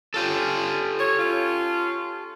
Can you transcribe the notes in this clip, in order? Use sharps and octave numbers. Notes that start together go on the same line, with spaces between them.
C#4 F4 G4 A4
C#5
C#4 F4